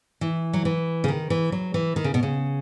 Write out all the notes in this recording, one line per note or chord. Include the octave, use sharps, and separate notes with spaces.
E3
F#3
E3
C#3
D#3
E3
F#3
E3
D#3
C#3
B2
C#3